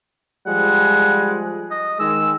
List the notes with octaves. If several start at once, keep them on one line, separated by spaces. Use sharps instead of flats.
F3 G3 G#3 F#5
D#5
D#3 G#3 E6